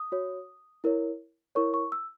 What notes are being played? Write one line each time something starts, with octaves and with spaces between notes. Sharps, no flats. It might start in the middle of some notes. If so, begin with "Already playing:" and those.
Already playing: D#6
F#4 C#5
E4 A#4 C#5
E4 A#4 C#5 C#6
C#6
E6